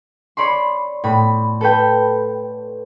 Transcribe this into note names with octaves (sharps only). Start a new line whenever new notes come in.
C#5 D5 B5 C6
A2 B5
A4 B4 G5